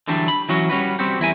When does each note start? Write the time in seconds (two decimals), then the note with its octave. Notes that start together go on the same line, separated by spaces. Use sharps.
0.08 D3 E3 F#3 G3 D4
0.28 B5
0.49 E3 F#3 C#4 F#4
0.70 G3 C#4 F#4 B4
0.99 G3 C4 F#4 G4
1.20 E2 E4 A#4 G#5